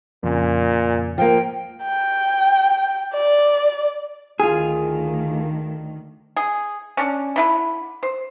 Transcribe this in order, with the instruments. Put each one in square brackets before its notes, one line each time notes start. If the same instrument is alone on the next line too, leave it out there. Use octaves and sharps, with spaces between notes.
[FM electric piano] F2 C#3 G#5 [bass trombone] A#2
[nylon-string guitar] F3 A#3 [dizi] G5
[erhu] G5
D5
[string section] D2 D#3 [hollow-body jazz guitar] F4 G#4
[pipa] G#4
C#4 D4
D3 E4 B5
C5